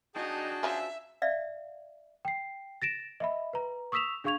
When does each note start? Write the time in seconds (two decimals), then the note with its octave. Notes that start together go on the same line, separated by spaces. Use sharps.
0.15 D4 D#4 F#4 G#4 G5 A5
0.63 F3 F#3 C#4 E5
1.22 D5 E5 F5
2.25 G5 C7
2.82 A6 A#6 D7 E7
3.20 D#5 E5 B5
3.53 B4 A#5
3.92 C#6 D#6 E6 B6 E7 F7
4.24 D4 G#4 F5 C#6 G#6 F7